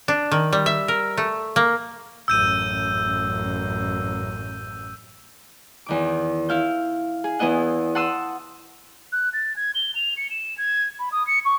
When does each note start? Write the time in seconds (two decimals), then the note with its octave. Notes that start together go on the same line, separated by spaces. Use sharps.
0.08 D4
0.31 D#3
0.53 G3
0.66 E5
0.88 A#4
1.17 A3
1.56 A#3
2.28 A1 F#2 E6 G6 D#7
5.86 E2 D#3 D6
6.49 E4 F5 G6
7.24 G#4
7.39 E2 B3 E4 D#5 F#5
7.95 F#5 A5 C6 D#6 E6 F#6
9.12 F#6
9.33 A6
9.56 G#6
9.75 G7
9.95 F7
10.17 C#7
10.30 E7
10.57 G#6
10.99 B5
11.12 D#6
11.27 C#7
11.45 C#6